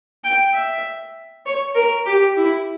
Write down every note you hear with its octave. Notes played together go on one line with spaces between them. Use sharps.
G5
E5
C#5
A#4
G4
E4